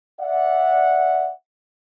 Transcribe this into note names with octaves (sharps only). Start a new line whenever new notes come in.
D5 E5 F#5